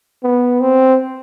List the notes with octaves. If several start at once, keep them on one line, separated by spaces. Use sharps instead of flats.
B3
C4